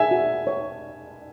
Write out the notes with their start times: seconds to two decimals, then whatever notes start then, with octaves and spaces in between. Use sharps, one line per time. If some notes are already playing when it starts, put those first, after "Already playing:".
Already playing: G#4 E5 G#5
0.11 F#4
0.47 C#5